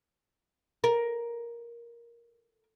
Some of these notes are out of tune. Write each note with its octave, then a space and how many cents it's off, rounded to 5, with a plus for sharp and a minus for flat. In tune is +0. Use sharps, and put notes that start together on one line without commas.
A#4 +10